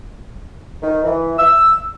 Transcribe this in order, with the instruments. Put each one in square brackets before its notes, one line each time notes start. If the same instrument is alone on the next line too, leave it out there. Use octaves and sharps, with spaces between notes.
[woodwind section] D#3
E3
E6